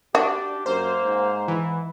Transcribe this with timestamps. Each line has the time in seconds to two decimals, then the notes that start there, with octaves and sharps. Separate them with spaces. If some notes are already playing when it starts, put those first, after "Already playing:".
0.15 D4 F#4 G4
0.66 F#2 A#3 C5
1.04 G#2
1.48 E3 E4